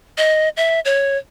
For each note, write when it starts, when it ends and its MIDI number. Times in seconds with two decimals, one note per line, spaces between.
0.18 0.49 75
0.57 0.80 76
0.85 1.17 73